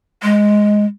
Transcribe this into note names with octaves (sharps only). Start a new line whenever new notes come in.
G#3